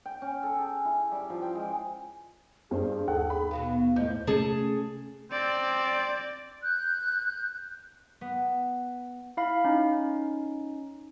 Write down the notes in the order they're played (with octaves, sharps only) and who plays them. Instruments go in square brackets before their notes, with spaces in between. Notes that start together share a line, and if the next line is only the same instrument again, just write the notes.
[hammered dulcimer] G5
C#4
A4
G#4
E4
G3
F3
G5
G#3
[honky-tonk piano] G2 C4 [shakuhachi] G#4
[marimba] D#2 [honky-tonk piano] A4 F#5
[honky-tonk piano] B5
[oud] B2 F#3 B3 [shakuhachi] F5
[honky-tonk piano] A2 G6 [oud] F3 [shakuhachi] D#5
[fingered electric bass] C3 A3 C#4 [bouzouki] G#4 A5
[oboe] C4 [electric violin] D5
[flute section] F#6 G6
[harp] B3
[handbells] E4 F5 B5
C#4 D#4